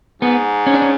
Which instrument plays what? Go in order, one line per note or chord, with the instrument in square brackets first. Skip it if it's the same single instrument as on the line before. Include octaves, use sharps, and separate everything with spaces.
[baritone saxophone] G#2 [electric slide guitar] B3
[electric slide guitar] C#4
D4
C#4